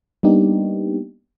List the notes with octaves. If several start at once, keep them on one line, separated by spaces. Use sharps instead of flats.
G3 A#3 B3 D4 D#4 G4